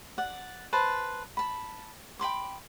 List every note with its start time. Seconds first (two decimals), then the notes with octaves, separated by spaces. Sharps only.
0.18 D5 F#5
0.73 B4 C5 A5
1.37 A5 B5
2.19 G5 B5 C6 D6